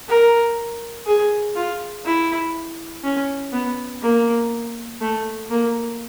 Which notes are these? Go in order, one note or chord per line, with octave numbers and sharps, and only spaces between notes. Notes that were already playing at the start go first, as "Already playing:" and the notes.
A#4
G#4
F4
E4
C#4
B3
A#3
A3
A#3